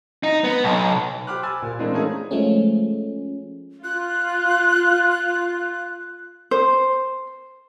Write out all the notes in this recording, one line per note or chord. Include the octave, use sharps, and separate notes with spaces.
D#4
B3
B1
G4 C5 B5 D6 F6 F#6
G#5 E6 A6
A#2
E3 G#3 A#3 C4 D4
A3 A#3 C#4 D#4 E4 G#4
F3 G#3 A3 C#4
F4 F#6
C5